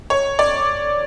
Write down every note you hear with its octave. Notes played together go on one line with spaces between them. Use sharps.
C#5
D5